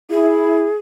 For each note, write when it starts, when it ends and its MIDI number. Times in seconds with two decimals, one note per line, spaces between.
0.11 0.65 64
0.11 0.75 68